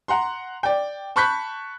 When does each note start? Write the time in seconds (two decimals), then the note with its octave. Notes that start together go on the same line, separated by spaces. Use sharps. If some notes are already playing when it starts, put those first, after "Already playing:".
0.08 F#5 A#5 C6
0.63 D5 G5
1.16 A5 B5 C#6 F#6 G6 B6